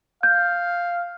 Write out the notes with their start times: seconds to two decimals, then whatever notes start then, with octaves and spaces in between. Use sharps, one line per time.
0.23 F5 G6